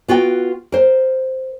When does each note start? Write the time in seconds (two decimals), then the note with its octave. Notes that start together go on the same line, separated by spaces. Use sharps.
0.08 B3 F4 F#4 G5
0.72 A#4 C5